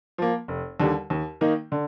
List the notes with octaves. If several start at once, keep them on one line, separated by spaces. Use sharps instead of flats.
F3 A#3
F1
D#2 D3 G3
D#2
D#3 A#3 D#4
D3